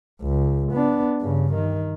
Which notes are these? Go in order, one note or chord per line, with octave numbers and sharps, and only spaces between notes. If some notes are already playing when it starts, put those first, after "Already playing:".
C#2
B3 D4
G2 C#3
D#3